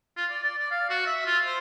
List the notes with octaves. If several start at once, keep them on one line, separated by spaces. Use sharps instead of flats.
F4
D5
D5
D5
F5
F#4
E5
F4
C5